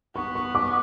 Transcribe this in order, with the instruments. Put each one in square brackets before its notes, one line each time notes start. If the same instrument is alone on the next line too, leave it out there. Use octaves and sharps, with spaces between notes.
[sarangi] B3 [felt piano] C#6
[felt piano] C#6
D6